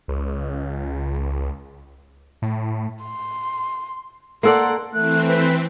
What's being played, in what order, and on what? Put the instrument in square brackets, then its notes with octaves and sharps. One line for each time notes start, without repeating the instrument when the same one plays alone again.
[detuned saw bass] C#2
A2
[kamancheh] C6
[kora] A#3 A4 D5 [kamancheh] F#5 C6
[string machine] E3 C4 [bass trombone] A3 [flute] F#6
[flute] B4